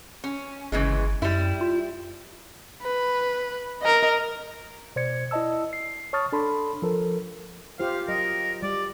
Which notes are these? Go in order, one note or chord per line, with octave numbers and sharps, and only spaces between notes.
C#4
G1 C#3 E3 G#3
F#2 G3 E4
F4
B4
A#4 D#5
B2 C5 D5 G#6 C#7
E4 D5 D#5 A5 E6
C7
C#5 A5 C#6 D#6 F6 A6
D4 A4 A5 B5 C6
F3 A4 A#4
F4 G4 C5 F5
F#3 A#4 D#5
G3 D5